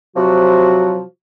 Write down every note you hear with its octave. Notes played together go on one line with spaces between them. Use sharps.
C3 F3 F#3 F#4